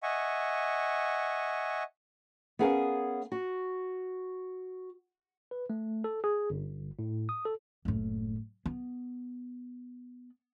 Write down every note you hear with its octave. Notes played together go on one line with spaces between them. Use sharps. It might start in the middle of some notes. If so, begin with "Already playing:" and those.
D#5 E5 F#5 G#5 C#6
B3 C#4 G#4 A#4 F5 G#5
F#4
B4
A3
A4
G#4
G1
A2
D#6
A4
F#1 A2
B3